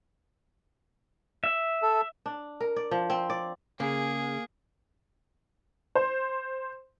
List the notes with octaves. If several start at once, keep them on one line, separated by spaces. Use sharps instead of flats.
E5
A4
D4
A#4
D5
F3
C4
D5
C#3 A#3 G#4
C5